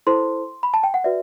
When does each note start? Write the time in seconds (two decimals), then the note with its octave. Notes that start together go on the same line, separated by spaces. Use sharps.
0.07 E4 A4 C5 C6
0.63 B5
0.74 A5
0.83 G5
0.94 F#5
1.04 F#4 B4 D5 E5